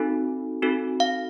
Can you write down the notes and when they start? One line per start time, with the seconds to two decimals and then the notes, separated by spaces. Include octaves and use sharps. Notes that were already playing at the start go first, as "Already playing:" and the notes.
Already playing: C4 D#4 F#4 A4
0.62 C4 D#4 F#4 A4
1.00 F5